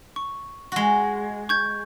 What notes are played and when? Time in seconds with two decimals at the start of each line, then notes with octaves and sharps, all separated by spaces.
0.16 C#6
0.72 G#3 F#4
1.49 C#6 G6 G#6